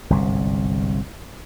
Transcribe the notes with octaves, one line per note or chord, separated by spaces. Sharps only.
G1 C2 G#2